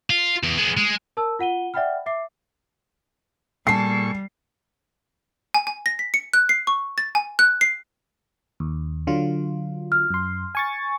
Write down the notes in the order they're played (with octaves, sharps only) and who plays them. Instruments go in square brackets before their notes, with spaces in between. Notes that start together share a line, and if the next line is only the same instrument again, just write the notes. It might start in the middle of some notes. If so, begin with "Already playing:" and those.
[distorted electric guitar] F4
E2
G#3 B3
G#3
[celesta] A#4 A5 E6
F4 F#5 D#7 G7
D5 E5 F#5 G5 B5 F6
E5 D6 C7
[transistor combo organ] A#2 C#6 [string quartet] G3 [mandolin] G#4 A4 [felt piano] C7
[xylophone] G#5
G#5
A#6
B6
C#7
F#6
C7
C#6
A6
G#5
F#6
C7
[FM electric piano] D#2
D3 F#3 F4
[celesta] F6
[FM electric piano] F#2 C6
G#5 C#6 A6